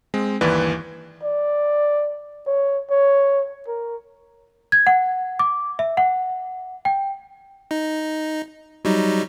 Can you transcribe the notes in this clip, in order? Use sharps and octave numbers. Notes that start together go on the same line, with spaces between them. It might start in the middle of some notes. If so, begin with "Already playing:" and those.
G#3 C4
G1 D#2 E3 B4 D5
D5
C#5
C#5
A#4
G#6
F#5
D6
E5
F#5
G5
D#4
F#3 G3 D#4